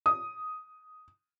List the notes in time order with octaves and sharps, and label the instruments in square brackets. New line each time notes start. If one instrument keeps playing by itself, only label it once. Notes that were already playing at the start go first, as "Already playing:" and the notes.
[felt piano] D#6